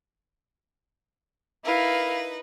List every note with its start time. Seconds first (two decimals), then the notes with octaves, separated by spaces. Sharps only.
1.65 D#4 E4 A#4 B4 F5